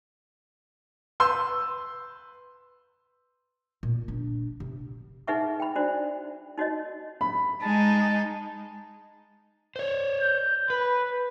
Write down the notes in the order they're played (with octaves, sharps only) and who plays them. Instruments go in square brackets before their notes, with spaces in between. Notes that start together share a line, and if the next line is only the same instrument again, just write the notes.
[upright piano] B4 C6 E6 G6
[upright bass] A#2
D4
C3
[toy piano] D#4 G#4 B4 E5 F#5 C#6
G5 B5
D4 F#4 C5 D5
D#4 F#4 C#5 D#5
[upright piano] B5
[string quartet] G#3 D#4 [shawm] A5
[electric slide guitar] C5 C#5
[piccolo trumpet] G6
[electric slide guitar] B4 [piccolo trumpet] B5